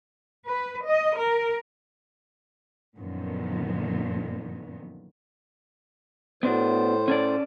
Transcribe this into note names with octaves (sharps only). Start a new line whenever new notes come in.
B4
D#5
A#4
F#2 A#2 D3 D#3 F3 B3
A2 B3 D4 F#4 C5
C#4 A4 D5